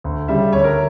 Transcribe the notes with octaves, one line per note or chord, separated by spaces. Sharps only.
D2
C#3 G3 E5
D2 C#5
A#4